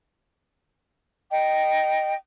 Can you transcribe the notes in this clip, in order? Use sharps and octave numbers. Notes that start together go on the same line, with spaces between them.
D#5 G5